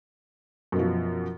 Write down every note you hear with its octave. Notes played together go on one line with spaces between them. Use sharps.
F#2 B2 F3